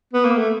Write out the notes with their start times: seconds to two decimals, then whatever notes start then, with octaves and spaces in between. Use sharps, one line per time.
0.13 B3
0.25 A#3
0.37 A3